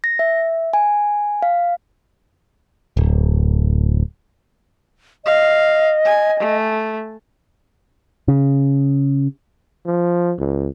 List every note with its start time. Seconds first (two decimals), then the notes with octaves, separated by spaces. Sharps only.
0.04 A#6
0.19 E5
0.73 G#5
1.42 F5
2.97 D1
5.25 D#5 F5
6.05 G#5
6.39 A3
8.28 C#3
9.86 F3
10.39 C#2